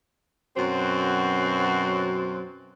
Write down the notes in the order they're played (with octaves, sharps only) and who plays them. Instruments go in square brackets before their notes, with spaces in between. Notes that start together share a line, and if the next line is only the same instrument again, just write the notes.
[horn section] F#2 B2 F#3 C4 F#4 C5